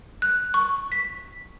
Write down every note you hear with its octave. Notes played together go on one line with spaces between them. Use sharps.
F#6
C#6
B6